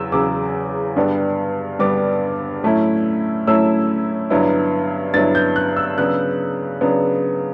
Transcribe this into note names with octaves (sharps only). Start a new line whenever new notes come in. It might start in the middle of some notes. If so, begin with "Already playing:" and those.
Already playing: E2 C#3 F#3 E6
E2 C#3 F#3 D6
G2 D3 G3 B3 D4
G2 D3 G3 B3 D4 D6
A2 F#3 A3 C#4 E4
A2 F#3 A3 C#4 E4 E6
G2 D3 F#3 B3 E4
G2 D3 F#3 B3 E4 A6
G6
F#6
E6
C#3 F#3 B3 D4 F#6
C#3 F#3 B3 D4